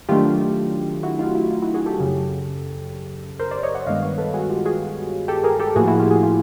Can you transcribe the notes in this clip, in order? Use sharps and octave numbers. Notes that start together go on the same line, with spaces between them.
D#3 F#3 A3 D4 F4 G4
E4 F#4
D#4 F4
E4
D#4 F4
E4 F#4
F#4 G#4
G4 A4
F#2 C#3 F#3
A#4 C5
C5 D5
C#5 D#5
E5 F#5
G2 D#3 G#3 B3 D#5 F5
B4 C#5
A4 B4
F#4 G#4
F4 G4
F#4 G#4
G4 A4
G#4 A#4
G4 A4
A2 F3 A#3 F#4 G#4
E4 F#4
F4 G4
F#4 G#4
F4 G4